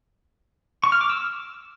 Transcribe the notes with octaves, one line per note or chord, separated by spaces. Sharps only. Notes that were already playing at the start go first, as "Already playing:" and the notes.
C#6
F6
D6
E6